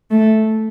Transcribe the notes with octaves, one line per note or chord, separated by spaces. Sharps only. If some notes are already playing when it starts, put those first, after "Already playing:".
A3